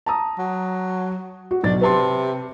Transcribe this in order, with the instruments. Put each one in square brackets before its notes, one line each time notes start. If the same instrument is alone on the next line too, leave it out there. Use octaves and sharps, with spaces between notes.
[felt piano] A5 A#5 D#6
[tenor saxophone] F#3
[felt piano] F#4
[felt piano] B1 A6 [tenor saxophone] D4
[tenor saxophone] C3 [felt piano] B4 A5 C6